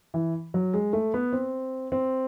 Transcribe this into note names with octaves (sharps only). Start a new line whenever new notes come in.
E3
F#3
G#3
A3
B3
C4
C4